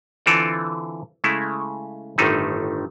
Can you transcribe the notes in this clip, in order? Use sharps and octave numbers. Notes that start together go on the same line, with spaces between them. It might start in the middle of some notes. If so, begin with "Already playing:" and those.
D3 E3 C4 F4 A4 D5
C#3 G#3 A3 E4
G1 A2 D3 D#3 A3 D#4